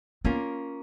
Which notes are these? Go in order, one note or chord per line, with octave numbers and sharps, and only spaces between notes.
A#3 B3 C#4 F4 A#4